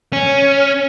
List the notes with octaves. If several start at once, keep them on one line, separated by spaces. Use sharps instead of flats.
C#4